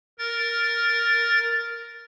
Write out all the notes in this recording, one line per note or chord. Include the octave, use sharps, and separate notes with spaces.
A#4 A6